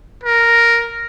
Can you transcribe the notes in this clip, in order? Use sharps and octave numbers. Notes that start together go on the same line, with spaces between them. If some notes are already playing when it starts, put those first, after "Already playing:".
A#4